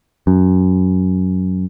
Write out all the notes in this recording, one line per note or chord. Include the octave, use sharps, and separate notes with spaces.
F#2